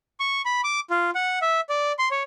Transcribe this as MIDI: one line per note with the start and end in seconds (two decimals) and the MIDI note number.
0.20 0.42 85
0.45 0.61 83
0.64 0.80 86
0.90 1.10 65
1.15 1.39 78
1.42 1.61 76
1.69 1.92 74
1.99 2.09 84
2.11 2.23 73